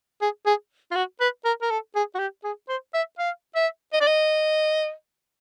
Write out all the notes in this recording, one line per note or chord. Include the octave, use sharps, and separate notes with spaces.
G#4
G#4
F4
F#4
B4
A#4
A#4
A4
G#4
F#4
G4
G#4
C5
E5
F5
E5
D#5
D5
D#5